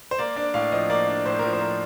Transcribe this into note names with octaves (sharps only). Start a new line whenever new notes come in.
C5
A#3 D5
D4 D5
A2 F5
F3 D#5
A#3 D5
D4
A2 C5
F3 A#4
C5
A#3